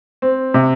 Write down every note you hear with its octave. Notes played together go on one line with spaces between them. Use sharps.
C4
C3